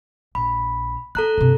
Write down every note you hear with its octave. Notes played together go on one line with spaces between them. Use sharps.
A#1 B5
B3 A4 A#5 F#6
G2 C3